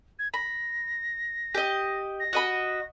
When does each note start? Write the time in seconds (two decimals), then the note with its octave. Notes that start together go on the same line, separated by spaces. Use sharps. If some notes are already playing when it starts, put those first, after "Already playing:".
0.19 G#6
0.34 B5 A#6
1.55 G4 D#5
2.20 A#6
2.33 F#4 D#5 B5